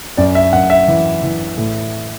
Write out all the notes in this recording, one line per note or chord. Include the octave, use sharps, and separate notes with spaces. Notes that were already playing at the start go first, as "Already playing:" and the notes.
F#2 D5
E5
F#2 F#5
E5
E3
E3
A2